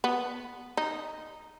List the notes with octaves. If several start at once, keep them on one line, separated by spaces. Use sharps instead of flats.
B3
D#4